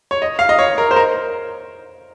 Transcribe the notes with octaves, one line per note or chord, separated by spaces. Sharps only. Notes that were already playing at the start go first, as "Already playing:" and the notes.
C#5
D#5
F5
D#5
C#5
A#4
C5
A#4